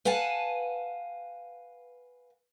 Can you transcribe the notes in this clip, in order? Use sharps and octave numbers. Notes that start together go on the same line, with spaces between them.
B4 F5 F#5 G#5 A5